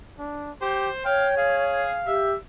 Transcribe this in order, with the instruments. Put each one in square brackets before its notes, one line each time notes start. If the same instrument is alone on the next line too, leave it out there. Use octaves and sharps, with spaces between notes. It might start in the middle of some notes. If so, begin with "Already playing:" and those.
[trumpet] D4
[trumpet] G4 [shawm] C5
[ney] C#5 [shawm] F5 [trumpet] G5
[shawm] G#4 [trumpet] F5
[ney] G4 [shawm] E5